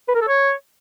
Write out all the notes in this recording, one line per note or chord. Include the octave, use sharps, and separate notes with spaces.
B4
A#4
A4
C#5